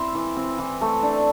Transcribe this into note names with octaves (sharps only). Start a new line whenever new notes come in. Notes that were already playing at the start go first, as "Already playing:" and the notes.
Already playing: C4 E4 E5 C6
E3
C4
E3
A3
D4